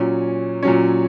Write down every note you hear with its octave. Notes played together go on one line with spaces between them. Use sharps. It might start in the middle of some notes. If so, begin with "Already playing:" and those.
Already playing: A#2 F#3 C#4
A#2 F#3 C#4